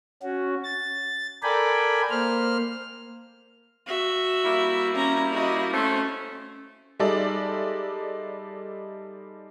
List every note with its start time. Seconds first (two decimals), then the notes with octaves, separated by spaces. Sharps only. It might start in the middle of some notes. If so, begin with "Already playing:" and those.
0.23 C#4 F#4
0.64 A6
1.43 A4 A#4 D5 G5 G#5 B5
2.10 A#3 C5 F6
3.86 F#4 E5
4.44 G3 A#3 E4
4.94 C#4 A#5
5.32 F#4 D#5
5.73 A3 C#4 C5
7.00 G3 G#3 D#4 A4 D5 E5